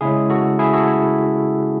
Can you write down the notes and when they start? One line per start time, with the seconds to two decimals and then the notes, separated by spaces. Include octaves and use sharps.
0.01 C#3 G#3 C#4 E4 G#4
0.30 F#4 A4
0.59 E4 G#4
0.73 F#4 A4
0.88 E4